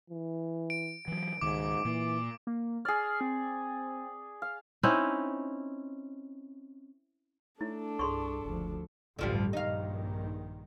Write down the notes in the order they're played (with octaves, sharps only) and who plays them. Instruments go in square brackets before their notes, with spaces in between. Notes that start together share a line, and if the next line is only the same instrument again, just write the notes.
[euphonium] E3
[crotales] D7
[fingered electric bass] E3 F#3
[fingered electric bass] C#2 D#3 [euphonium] G#2 [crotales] D6
[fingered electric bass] A#2 A#3 [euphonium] E3
[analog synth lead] A#3
[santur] G#4 D5 [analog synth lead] F6
[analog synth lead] C4
[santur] F5
[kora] C4 C#4 D#4 E4
[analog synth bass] A3 [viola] D4 A4 [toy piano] E4
[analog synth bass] C2 [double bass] G2 [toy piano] G#4 C6 C#6
[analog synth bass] F#1 [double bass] D2 F3
[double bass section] A1 D2 G2 [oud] D3 F3 G3
[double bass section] A#1 G2 D#3 [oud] D#4 F5